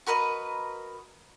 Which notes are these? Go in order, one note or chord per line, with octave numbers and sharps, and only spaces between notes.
F#4 A#4 B4 D#5